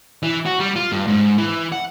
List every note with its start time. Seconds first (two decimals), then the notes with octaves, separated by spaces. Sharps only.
0.23 E3
0.46 F#4
0.60 G3
0.76 F4
0.92 G2
1.07 G#2
1.38 E3
1.72 F#5